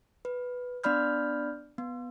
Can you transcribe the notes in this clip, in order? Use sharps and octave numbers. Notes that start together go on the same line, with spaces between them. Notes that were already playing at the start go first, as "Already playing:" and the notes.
B4
B3 D4 D5 B5 F6 G6
B3